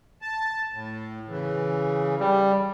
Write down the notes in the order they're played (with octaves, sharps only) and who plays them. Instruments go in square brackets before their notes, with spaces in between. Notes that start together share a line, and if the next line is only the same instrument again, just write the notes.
[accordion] A5
A2
C#3 E3
[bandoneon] G3